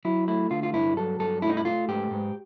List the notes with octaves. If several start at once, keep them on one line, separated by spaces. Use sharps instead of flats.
F#3 E4
A3 E4
D3 F4
F4
G2 E4
F#3 A4
G2 A4
A3 E4
D#4
E4
A3 F4
G#2 G4
G#2